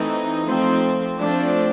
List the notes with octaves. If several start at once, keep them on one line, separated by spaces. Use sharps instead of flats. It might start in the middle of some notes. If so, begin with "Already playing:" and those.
Already playing: E3 A3 C4 D#4
F3 A3 C4
F3 A3 C4 D4